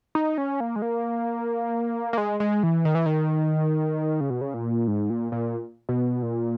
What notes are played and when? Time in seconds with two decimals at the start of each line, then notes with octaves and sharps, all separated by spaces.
0.15 D#4
0.38 C#4
0.60 A#3
0.76 G#3
0.82 A#3
2.13 A#3
2.18 G#3
2.40 G#3
2.63 E3
2.85 D#3
2.95 E3
3.06 D#3
4.21 C#3
4.30 B2
4.41 C#3
4.54 A#2
4.88 G#2
5.10 A#2
5.32 A#2
5.89 B2
6.23 A#2